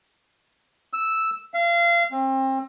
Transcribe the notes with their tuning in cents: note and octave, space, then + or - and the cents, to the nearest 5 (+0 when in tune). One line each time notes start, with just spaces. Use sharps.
E6 -5
F5 -30
C4 +30